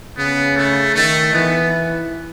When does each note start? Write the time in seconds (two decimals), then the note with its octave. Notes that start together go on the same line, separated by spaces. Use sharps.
0.18 C#3 B3
0.56 A3
0.95 D#3 A3
1.33 E3 B3